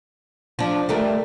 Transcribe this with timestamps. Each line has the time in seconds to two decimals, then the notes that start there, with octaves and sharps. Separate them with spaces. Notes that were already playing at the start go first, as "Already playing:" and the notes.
0.59 F3 D4
0.89 G3 A3 A#4